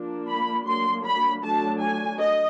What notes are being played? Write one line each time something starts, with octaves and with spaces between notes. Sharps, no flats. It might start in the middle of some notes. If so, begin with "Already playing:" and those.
Already playing: F3 A#3 D4
B5
F#3 A#3 D4 C6
B5
F#3 A3 D4 A5
G#5
D#5